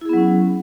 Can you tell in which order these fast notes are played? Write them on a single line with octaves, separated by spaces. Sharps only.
E4 G#4 B3 F#3 C#4